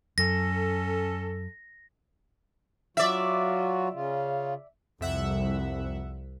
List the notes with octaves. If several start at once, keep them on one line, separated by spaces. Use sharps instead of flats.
F#2 C#4 A4 A#6
F#3 F4 F#4 D5 E5
C#3 F4
C2 F2 E5 F#5